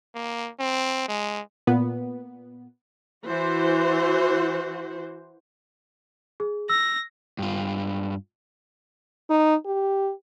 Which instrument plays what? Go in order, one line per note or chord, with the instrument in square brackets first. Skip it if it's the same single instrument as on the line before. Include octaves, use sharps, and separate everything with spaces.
[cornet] A#3
C4
G#3
[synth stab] A#2 B3
[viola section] E3 F#4 C5
[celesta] G#4
[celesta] E6 [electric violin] A#6
[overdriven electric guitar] G2 F4
[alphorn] D#4
G4